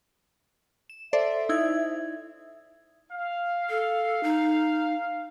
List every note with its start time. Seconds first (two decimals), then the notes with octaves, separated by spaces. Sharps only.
0.90 E7
1.13 A4 C5 D5 E5
1.49 D#4 E4 G#6
3.12 F5
3.69 A4
4.23 D#4